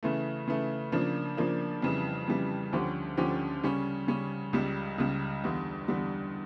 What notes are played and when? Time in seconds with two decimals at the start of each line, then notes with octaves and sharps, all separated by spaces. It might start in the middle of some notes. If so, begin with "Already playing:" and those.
0.03 C#3 E3 A3
0.47 C#3 E3 A3
0.92 C#3 F3 A#3 D4
1.37 C#3 F3 A#3 D4
1.82 F2 C#3 E3 G3
2.28 F2 C#3 E3 G3
2.73 D2 D3 F3 C#4 G4
3.17 D2 D3 F3 C#4 G4
3.63 C#3 G3 C#4
4.08 C#3 G3 C#4
4.53 C#2 C#3 G3
4.98 C#2 C#3 G3
5.44 E2 D3 G3
5.88 E2 D3 G3